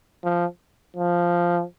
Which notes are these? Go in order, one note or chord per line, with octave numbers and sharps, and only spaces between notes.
F3
F3